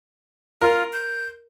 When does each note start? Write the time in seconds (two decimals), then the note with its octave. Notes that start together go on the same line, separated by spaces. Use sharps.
0.61 F4 A#4
0.93 G6